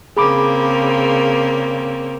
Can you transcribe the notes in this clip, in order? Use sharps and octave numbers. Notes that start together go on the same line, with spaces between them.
C#3 A#3 C4 G#4 B5 D6